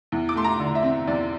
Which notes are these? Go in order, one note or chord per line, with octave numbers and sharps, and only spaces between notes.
E2
D6
A3 C6
A#5
D3
E5
C4
E2 D5